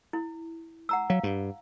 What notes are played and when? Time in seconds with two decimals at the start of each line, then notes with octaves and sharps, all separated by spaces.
0.13 E4
0.89 F#5 A#5 E6
1.10 F#3 F5
1.23 G2